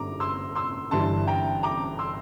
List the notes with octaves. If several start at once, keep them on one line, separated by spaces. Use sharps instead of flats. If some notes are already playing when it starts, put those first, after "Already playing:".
Already playing: G1 G2 D3 G3 A#5 D6
C6 E6
C6 E6
G1 G2 E3 G3 A5 C6
G5 A#5
A#5 D6
C6 E6